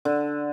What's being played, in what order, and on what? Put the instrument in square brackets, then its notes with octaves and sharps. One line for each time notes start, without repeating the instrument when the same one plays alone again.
[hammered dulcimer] D3